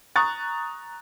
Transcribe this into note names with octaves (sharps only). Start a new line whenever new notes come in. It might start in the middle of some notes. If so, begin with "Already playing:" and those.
A#5 C#6 D#6 F#6 A6